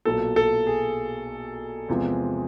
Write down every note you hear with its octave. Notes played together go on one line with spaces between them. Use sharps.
B1 A#2 F#3 A4
A4
G#4
E2 C3 F3 G#3